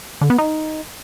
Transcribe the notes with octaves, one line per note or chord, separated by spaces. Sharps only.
D3
B3
D#4